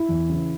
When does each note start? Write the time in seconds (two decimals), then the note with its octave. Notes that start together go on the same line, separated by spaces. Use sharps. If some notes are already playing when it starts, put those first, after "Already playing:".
Already playing: E4
0.09 E2
0.29 C#3 E3